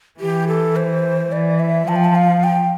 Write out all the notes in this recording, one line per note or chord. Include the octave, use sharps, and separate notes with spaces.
E3 G4
A4
C5
E3 D5
E5
F3 A5
G5
A5
F5
G5